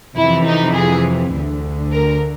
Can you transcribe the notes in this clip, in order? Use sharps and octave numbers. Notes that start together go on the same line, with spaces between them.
F2 C3 E3 E4
D#4
G#4
D2 D3
A#4